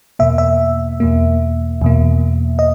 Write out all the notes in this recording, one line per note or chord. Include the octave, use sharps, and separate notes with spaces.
E2 B2 A#3 E5
E5
E2 B2 A#3
E2 B2 A#3
D#5